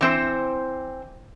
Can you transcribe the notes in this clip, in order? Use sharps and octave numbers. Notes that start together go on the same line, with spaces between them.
E3 C4 C5